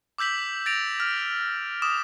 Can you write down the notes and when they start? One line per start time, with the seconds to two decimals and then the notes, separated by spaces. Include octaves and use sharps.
0.18 D6 E6 G6 B6 F#7
0.66 A6 A#6 D7 F7
1.00 F6
1.82 D6 D#6 E7